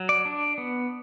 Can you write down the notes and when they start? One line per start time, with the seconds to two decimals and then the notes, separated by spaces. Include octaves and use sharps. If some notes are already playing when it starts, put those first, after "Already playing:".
Already playing: F#3
0.09 D5
0.25 D4
0.58 B3